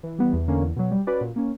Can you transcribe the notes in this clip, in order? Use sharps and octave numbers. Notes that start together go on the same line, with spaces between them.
E3
G3 B3
E2
D3 A#3 C#4
E2
B2 F#3
G3
C#4 F#4 B4 D5
A#2
A#3 C#4